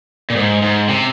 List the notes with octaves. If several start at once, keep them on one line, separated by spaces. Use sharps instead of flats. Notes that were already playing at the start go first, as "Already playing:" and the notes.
A#2
G#2
G#2
C3